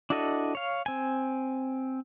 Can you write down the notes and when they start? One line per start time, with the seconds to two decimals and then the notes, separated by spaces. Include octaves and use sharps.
0.10 D4 E4 F#4 A4 D#5
0.55 C#5 F5
0.86 C4 G#5